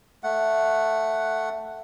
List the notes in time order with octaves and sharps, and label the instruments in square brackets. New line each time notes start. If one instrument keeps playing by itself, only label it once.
[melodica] A3 F#5